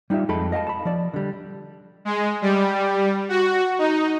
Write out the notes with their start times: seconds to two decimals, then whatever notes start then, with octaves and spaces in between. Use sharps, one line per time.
0.10 G3 D#4 F4 G4 E5
0.29 F2 G#3 A4 B5
0.52 D#5 F5 G5 A5
0.67 A5 B5
0.85 F3 D5
1.14 D3 G3
2.05 G#3
2.42 G3
3.29 F#4
3.79 D#4